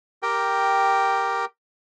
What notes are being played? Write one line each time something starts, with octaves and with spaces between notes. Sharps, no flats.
G4 A#4 G5